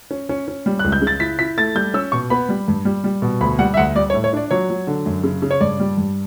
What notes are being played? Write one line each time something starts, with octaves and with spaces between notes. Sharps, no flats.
C#4
C#4
C#4
G3
C#2 F#6
G6
C#3
A6
E4 B6
E4 B6
A3 A6
G3 G6
C#4 E6
B2 C#6
B3 B5
G3
G2
G3
G3
B2
D2 B5
G3 F#5
E5
D2 F#5
G3 D5
C#5
A2
C#5
D4 D5
F#3 C#5
F#3
D3
F#2
C#3
C#3
C#5
G2 D5
G3
G2